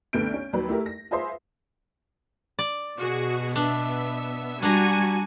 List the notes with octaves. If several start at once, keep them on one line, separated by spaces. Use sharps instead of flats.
C2 D3 A3 B3 G6 D7
C#4
D#2 F#3 B4
A3 E4 G4 A#4
A#6
F4 G#4 B4 C5 E5 C6
D5
B2 F#4 G#4
B3 D4 E5
G3 D4 F#4 G#5 A#5